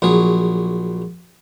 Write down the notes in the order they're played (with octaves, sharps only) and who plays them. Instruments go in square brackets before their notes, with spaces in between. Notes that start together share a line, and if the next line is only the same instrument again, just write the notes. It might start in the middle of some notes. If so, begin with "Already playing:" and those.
[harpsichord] A#1 F#3 G#4